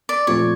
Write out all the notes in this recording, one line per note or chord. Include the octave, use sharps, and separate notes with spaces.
D5
A#2 F3 A3 C4 C#5